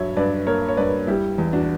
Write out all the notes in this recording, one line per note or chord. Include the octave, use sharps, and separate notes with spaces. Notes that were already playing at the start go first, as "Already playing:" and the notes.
Already playing: G2 F#3 C#5 E5
G2 B4 D5
A#3 A#4 C#5
C#5
G2 B4 D5
G3 E4 G4
E2
D4 F#4